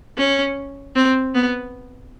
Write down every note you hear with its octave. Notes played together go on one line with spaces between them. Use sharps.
C#4
C4
B3